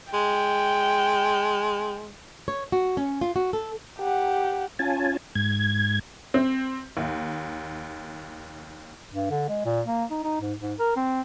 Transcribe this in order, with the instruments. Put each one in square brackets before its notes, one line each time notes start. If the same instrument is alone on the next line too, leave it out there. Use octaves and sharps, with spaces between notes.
[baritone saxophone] G#3 [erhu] G5
[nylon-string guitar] C#5
F#4
C#4
F4
F#4
A4
[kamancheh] G4 F#5
[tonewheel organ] C#4 F4 G#5 A5
G#2 G#6
[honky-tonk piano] C4
D#2
[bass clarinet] G2
D3
G#3
A#2
A#3
D#4
D#4
G#2
G#2
A#4
C4